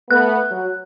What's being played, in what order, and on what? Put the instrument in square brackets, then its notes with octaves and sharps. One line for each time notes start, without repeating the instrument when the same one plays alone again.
[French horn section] A3 B3 [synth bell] F#6
[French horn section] F#3